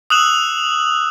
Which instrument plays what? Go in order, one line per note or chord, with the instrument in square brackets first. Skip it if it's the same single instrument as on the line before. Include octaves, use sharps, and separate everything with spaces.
[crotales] D#6 E6 F#6 E7 F#7